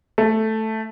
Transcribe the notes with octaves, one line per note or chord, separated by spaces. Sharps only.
A3